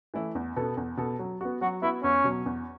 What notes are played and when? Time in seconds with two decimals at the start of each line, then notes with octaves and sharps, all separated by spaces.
0.14 E3 A3 E4
0.35 E2
0.56 B2 B3 A4
0.77 E2
0.97 B2 B3 A4
1.19 F#3
1.41 B3 F#4
1.61 F#3 F#4
1.82 B3 E4 F#4
2.03 E2 C#4
2.24 B2 F#3
2.46 E2